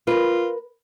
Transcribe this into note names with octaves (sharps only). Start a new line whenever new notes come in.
F4 A#4 B4